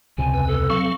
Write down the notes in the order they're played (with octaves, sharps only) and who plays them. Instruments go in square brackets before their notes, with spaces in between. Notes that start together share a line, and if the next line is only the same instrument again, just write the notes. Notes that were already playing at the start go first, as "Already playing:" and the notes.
[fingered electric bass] C#2 C3 [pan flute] G#5
[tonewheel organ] E2 B4
[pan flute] A4
[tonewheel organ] F#3 C4 F5 [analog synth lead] C#6